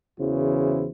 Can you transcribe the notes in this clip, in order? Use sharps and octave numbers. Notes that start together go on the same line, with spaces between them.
E2 C#3 E3 E4 F#4 C5